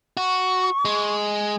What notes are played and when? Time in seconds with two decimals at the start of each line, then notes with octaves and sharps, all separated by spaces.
0.17 F#4 C#6
0.85 G#3